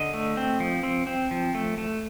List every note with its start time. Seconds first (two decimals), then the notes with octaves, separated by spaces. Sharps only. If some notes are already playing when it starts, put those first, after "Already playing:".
Already playing: D3 D#5
0.14 A3
0.37 C4
0.60 F3
0.83 C4
1.07 C4
1.31 F3
1.55 A3
1.78 A3